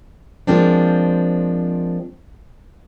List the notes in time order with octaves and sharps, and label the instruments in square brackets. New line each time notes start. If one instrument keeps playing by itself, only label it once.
[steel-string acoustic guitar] F3 G#3 A#3 C4 D4